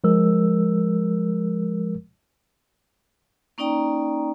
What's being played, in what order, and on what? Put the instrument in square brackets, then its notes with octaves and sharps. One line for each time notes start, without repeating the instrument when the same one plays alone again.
[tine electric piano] F3 G#3 A#4 E6
[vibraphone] A#3 C#4 D#4 D5 G5 A#5